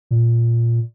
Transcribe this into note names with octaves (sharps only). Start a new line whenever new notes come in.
A#2